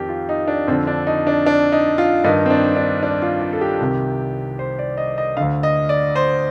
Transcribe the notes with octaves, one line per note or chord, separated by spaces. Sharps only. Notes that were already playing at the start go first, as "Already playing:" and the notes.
Already playing: F2 D#3 G4 A#4
F4
D#4
D4
F2 D3 C4
D4
D#4
D4
D4
D#4
F4
G2 D#3 D#4
C4
D4
D4
D4
F4
F4
A4
G4
C2 C3 D#3
C5
D5
D#5
D#5
D2 D3 F5
D#5
D5
C5